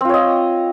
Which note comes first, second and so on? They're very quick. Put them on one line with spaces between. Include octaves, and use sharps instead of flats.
C4 F4 C#5 D#5